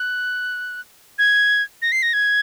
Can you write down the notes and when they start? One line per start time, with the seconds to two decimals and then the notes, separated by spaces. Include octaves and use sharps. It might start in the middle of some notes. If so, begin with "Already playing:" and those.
Already playing: F#6
1.19 G#6
1.82 A#6
1.92 C7
2.03 A#6
2.13 G#6